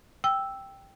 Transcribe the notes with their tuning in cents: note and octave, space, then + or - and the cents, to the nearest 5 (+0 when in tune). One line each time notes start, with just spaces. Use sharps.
G5 +0 E6 +0